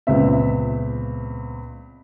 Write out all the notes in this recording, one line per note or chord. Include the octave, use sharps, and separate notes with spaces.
C#2 A#2 B3 C4 E5